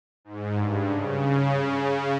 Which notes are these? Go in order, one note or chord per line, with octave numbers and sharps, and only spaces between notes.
G#2
G2
C#3